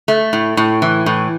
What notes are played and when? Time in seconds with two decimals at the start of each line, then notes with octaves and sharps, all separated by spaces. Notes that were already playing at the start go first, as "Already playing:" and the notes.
0.08 A3
0.33 A2
0.57 A2
0.82 E3
1.06 A2